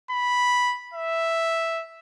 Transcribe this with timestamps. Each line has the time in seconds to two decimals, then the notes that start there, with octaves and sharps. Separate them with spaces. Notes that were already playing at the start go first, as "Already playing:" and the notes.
0.11 B5
0.94 E5